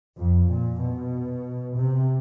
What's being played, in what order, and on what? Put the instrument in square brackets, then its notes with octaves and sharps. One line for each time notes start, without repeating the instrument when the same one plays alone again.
[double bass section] F2
A#2
B2
C3